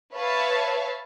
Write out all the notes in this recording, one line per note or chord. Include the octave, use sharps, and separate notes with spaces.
B4 C#5 E5 F5 A5